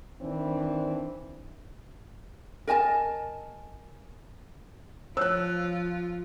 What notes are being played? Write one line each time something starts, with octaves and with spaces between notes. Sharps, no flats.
D#3 E3 C4 D4
A#4 D#5 G#5 A5
F3 F4 C5 C#5 E6 F#6